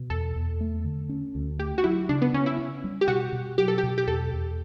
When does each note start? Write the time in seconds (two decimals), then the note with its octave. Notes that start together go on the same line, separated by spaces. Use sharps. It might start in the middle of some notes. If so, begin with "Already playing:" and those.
Already playing: B2
0.10 E2 A4
0.36 E2
0.61 A3
0.84 D3
1.09 C#4
1.35 D2
1.59 A3 G4
1.78 F#4
1.84 F#3 E4
2.09 C#3 D4
2.22 B3
2.34 C#3 C#4
2.46 E4
2.58 C#4
2.84 G3
3.01 G4
3.08 B2 F#4
3.33 B2
3.58 F#3 G4
3.68 A4
3.78 G4
3.83 B2
3.98 G4
4.07 E2 A4
4.33 E2